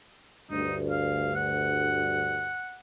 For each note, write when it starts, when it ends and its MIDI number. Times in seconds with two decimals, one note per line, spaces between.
0.51 2.55 38
0.51 2.55 43
0.51 0.75 63
0.91 1.33 77
1.35 2.79 78